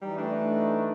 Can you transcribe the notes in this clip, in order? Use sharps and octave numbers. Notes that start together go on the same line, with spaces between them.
E3 G3 D#4
A3 D4